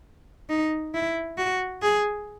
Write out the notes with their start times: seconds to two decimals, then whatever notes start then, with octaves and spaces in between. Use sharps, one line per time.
0.49 D#4
0.94 E4
1.37 F#4
1.82 G#4